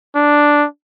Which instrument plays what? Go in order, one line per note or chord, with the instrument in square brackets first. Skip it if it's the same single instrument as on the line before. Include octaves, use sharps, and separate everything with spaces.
[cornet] D4